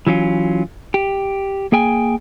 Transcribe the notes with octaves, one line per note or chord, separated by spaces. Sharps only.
E3 F#3 C#4 F4
G4
A#3 G#4 G5 G#5